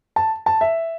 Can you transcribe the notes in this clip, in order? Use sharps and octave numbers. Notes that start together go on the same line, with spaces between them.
A5
A5
E5